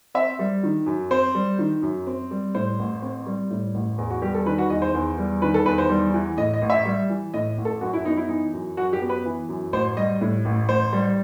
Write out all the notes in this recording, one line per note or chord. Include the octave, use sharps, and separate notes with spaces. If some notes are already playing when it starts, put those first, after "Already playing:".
C4 E5
G3
D#3
F#2
C4 C5
G3
D#3
F#2
C4
G3
A2 C5
A1
C4
G3
A2
A1
E2
F#4
G3 G4
A4
D#3 B4
F#4
E2 D#5
C5
E2
G3
D#3 B4
A4
E2 B4
C5
G3
E3
A2 D#5
D#5
A1
E5
G3
E3
A2 D#5
A1
A4
F#2 F#4
E4
B3 D#4
E4
E3 D#4
F#2
F#2 F#4
G4
B3
B4
E3
F#2
A1 C5
G3 D#5
A2
A1
A1 C5
G3